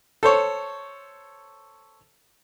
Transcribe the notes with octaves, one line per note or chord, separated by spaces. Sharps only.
A4 C5 C#5